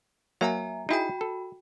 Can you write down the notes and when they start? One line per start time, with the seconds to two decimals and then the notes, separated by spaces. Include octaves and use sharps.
0.41 F#3 A#3 E5 G#5 A#5
0.89 D#4 E4 F#4 G#4 G5 B5
1.21 A4